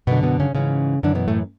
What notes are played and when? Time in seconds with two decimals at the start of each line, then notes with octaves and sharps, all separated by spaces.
0.07 F#2 B2 D3 B3
0.23 B2 B3
0.40 C#3 C#4
0.55 G#2 C#3 E3 C#4
1.03 F#2 D3 E3 D4
1.15 B2 B3
1.28 A2 A3